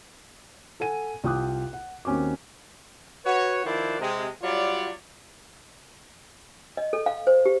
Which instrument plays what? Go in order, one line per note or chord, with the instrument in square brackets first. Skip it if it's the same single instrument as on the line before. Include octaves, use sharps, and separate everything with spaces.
[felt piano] A4 F#5 G#5 D#7
C2 F4 G5 D6 D#6 F#6
F#5
D#2 C4 C#4 F#4 D6
[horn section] F#4 B4 C#5
D#3 F3 E4 B4 C5 D5
C3 G#3
F#3 G3 F4 C#5 D5
[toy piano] D#5
A4
F5
C5
G4